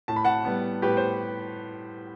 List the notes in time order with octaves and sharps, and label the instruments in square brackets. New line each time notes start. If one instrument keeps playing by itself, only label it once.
[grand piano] A2 A5
B5
F#5 A5
G3 B3
A2 G4 B4
C5